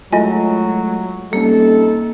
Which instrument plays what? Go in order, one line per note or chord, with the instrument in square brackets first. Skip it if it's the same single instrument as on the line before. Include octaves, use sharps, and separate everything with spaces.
[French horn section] F#3 [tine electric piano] G#3 A3 [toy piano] E4 F4 G#5 [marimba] D#5
[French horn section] C3 D#4 A4 [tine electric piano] G3 C#4 [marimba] A#3